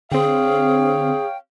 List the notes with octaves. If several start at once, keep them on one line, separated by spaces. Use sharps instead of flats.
D3 C4 G#4 C#5 F5 G5